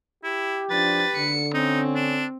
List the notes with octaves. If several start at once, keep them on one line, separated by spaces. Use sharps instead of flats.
E4 G4
F3 D4 B4 A6
D3 C#7
C4 C#4 D#4
D4